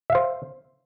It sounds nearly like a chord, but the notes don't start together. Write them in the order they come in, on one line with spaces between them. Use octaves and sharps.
E5 F5 C5